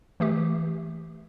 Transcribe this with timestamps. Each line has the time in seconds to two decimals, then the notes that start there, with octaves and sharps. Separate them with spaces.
0.20 E3 A3 G4